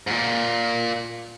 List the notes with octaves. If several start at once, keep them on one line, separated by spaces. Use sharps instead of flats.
G#2
A#2